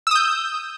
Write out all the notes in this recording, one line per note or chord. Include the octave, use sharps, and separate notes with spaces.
D#6 E6 G6